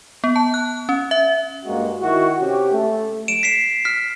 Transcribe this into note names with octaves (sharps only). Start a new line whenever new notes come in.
B3
A5
F#6
C#4
E5
G2 G#3 A#3 F#4
D#3 E4 F#4
C3 C#4 G4
A3
D7 E7
B6 C7 E7
F6 B6